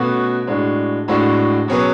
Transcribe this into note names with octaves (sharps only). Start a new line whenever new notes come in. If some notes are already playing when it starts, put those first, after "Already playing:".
Already playing: B2 A3 C#4 F#4 B4
A2 G#3 D4 F#4
A2 G#3 D4 F#4
B2 F#3 C#4 G#4 B4